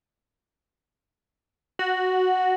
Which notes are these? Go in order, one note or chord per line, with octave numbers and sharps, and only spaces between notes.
F#4